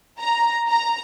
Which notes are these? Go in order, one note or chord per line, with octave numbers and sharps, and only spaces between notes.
A#5
A#5